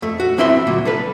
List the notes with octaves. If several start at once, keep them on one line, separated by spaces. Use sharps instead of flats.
F2 A3
F#4
F3 C4 E4 B4 E5 C6
D2 A#2 F#3
C2 A4 B4